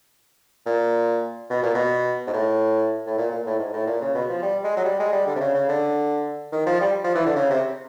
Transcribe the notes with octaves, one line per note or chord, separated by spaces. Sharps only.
A#2
B2
A#2
B2
G#2
A2
A2
A#2
A#2
A2
G#2
A2
A#2
C#3
B2
F3
G3
G#3
F#3
G3
G#3
G3
D3
C3
C#3
C#3
D3
D#3
F3
G3
F3
E3
D3
C#3
C3